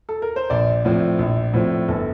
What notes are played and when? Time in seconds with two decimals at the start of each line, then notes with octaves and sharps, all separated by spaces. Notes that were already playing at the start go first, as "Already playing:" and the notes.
0.09 A4
0.22 A#4
0.36 C5
0.50 A#1 D5
0.85 A2 F3 C4
1.19 A#1
1.54 A2 F3 C4
1.88 G1 A4